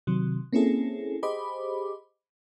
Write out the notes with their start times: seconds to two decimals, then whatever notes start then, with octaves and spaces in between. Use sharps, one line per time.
0.07 C3 D#3 F#3
0.53 A#3 C4 C#4 E4 G#4 A4
1.23 G4 G#4 C5 D#5 B5 D6